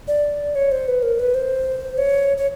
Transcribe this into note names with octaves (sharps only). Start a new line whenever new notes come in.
D5
C#5
C5
B4
A#4
B4
C5
C#5
C#5